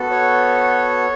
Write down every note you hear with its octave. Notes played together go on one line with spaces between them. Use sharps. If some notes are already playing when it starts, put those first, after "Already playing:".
Already playing: B3 F#4 A4
C#5